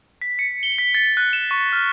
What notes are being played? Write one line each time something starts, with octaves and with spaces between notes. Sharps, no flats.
B6
C#7
G7
B6
A6
F#6
E7
C#6
F6